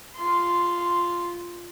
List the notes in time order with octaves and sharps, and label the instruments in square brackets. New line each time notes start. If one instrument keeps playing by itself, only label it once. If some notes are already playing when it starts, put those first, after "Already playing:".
[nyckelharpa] F4 C6